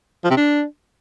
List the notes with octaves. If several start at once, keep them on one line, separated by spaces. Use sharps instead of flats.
F3
C3
D4